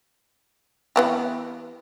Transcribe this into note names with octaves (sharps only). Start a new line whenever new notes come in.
E3 B3 G4